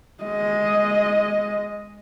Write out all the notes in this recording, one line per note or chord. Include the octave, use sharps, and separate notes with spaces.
G#3 D#5